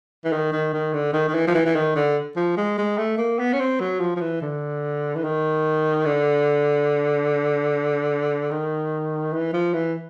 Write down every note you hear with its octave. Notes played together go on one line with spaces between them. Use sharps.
E3
D#3
D#3
D#3
D3
D#3
D#3
E3
F3
E3
E3
D#3
D3
F3
G#3
G#3
A3
A#3
B3
C#4
C4
F#3
F3
F3
E3
D3
E3
D#3
D3
D#3
E3
F3
E3